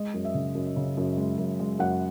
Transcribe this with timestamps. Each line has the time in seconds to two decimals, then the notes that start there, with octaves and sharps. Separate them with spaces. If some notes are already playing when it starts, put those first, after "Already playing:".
Already playing: G#3 D#5
0.14 F#2
0.25 E5
0.34 C#3
0.55 F#2
0.76 C#3
0.97 F#2
1.17 G#3
1.38 F#2
1.59 G#3
1.79 F#2 F#5